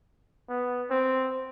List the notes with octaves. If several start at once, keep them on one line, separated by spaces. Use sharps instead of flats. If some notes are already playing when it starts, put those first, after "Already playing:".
B3
C4